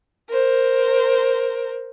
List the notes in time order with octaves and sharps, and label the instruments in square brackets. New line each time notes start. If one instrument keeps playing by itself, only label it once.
[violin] A#4 C5